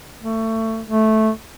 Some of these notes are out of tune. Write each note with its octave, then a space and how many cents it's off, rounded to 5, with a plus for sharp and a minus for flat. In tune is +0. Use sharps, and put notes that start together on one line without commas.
A3 +25
A3 -10